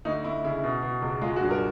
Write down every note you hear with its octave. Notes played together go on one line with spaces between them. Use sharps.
D2 D#4
D2 E4
C#3 E4
B2
B2
C#2
G#3 F4
F#4
G2
A#4